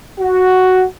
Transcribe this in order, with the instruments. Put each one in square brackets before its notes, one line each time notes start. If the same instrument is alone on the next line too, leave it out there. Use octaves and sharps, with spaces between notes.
[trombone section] F#4